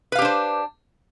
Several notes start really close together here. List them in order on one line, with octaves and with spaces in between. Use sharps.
B4 F5 G4 D4 C5